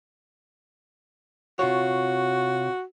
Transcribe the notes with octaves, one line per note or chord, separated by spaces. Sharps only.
C3 F4 F#4 C#5